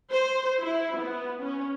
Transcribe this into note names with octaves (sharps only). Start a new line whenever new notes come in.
C5
E4
B3
C#4